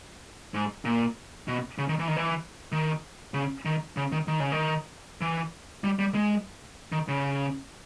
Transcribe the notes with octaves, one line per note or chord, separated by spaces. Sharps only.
G#2
A#2
B2
C#3
D#3
E3
D#3
E3
D#3
C#3
D#3
C#3
D#3
D#3
C#3
D#3
E3
G3
G3
G#3
D#3
C#3